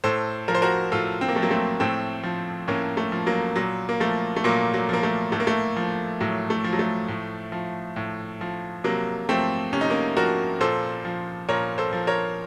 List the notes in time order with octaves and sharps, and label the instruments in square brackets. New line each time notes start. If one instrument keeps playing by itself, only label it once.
[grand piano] A2 A4 C5
F3 A#4
C5
F#4 A#4
A2 F4 A4
C4
A#3
F3 A3
F#3 A#3
A3 C4
A2 A3 C4
F3
A2 A#3 C#4
A3
F3
F#3 A#3
A#2 F#3
A#3
F3 A3
A3
A#2 F#3 A#3
F#3
F3 A#3
A3
A2 A3
A#3
A3
F3
A2 F#3
A3
F3
F#3
A3
A2
F3
A2
F3
C3 F#3 A#3
F3 A3 C4
C3 C#4
D#4
A#3 C#4
F3 F#4 A#4
A#2 A4 C5
F3
A#2 A#4 C#5
A4 C5
F3
A#4 C#5